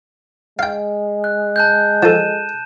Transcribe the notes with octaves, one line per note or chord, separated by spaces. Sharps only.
G#3 F5 G5
F#6
A5 F#6 G6
F3 A4 D#7 E7